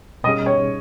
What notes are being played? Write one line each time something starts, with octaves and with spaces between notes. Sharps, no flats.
B2 G3 C#4 G#4 D#5
C#5